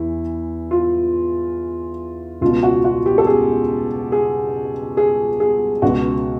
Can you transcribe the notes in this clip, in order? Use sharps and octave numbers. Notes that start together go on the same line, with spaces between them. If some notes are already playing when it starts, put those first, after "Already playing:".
Already playing: E2 E3 E4
F4
C#2 B2 F4
F#4
F#4
G4
A4
G#4
G#4
G#4
G#4
C#2 B2 F#4